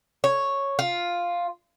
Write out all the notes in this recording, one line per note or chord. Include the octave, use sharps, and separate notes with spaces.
C#5
F4